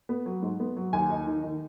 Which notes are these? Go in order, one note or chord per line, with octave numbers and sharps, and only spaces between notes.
B3
F#3
G#2
B3
F#3
D#2 G#5
D#4
D#3
D#3